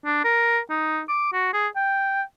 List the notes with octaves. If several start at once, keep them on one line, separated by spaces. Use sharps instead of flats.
D4
A#4
D#4
D6
F#4
G#4
G5